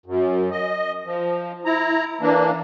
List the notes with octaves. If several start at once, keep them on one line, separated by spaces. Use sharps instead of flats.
F#2
D#5
F3
E4 A#5
E3 A#3 D4